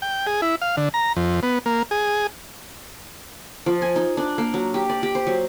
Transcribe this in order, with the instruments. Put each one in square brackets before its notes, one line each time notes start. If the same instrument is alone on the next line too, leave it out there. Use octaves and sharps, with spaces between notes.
[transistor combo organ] G5
G#4
E4
F5
D3
A#5
F2
B3
A#3
G#4
[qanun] F3
G#5
D#4
D4
A#3
F#3
G4
D5
G4
C5
F#3